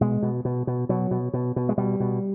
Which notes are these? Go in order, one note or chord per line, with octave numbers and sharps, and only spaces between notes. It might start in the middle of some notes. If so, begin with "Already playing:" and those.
B2 G#3
B2
B2
B2
B2 F#3
B2
B2
B2
G#3
B2 G3
B2